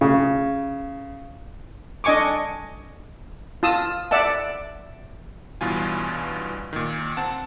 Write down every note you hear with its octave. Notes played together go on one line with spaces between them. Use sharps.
C#3
D4 D#5 G#5 C#6 D6
F4 A5 D#6 E6
D5 E5 F#5 A5
A1 G2 B2 E3 F4 G#5
A#2 D#3
C4 F#5 A5